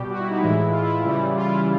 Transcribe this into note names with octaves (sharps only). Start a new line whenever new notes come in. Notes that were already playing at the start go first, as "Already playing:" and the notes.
Already playing: B2 G3 G4
F#4
E4
D#4
A2 E3 G#3 E4
E4
F4
E4
C#3 E3 G3
F4
E4